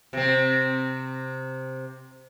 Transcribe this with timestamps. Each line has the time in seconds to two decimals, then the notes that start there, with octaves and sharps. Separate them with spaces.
0.13 C3 C4